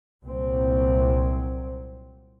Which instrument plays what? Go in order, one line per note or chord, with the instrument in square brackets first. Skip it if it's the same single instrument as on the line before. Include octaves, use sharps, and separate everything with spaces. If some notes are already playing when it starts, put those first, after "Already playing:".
[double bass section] C2 A#2 F#3 C4